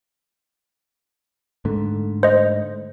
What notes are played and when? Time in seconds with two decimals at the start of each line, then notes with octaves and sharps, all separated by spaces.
1.65 G#2 D3 A3
2.23 C5 D#5